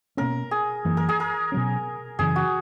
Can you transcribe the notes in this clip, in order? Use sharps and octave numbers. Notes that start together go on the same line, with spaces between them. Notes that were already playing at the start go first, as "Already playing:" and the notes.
B2 A#3 C#4 A#4
G#4
F#2 E3 A#3
A#4
G#4
A#4
B2 F#3 C#4
F#2 C#3 E3 G#4
F#4